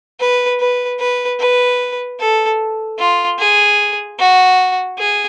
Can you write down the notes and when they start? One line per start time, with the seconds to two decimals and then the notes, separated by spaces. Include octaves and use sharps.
0.20 B4
0.60 B4
1.00 B4
1.39 B4
2.20 A4
2.99 F4
3.39 G#4
4.19 F#4
4.98 G#4